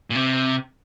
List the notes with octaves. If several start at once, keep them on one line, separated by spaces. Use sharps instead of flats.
A#2
C3